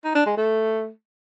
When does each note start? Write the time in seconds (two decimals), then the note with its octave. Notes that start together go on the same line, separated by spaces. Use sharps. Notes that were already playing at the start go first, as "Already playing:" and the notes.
0.04 D#4
0.15 D4
0.26 G#3
0.37 A3